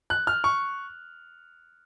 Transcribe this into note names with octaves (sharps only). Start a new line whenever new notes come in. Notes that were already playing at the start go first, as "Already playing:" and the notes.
F#6
F6
C#6